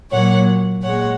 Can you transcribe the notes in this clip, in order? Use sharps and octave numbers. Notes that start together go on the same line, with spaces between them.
A#2 F#3 A#3 C#5 F#5
A#2 G#3 C#5 F#5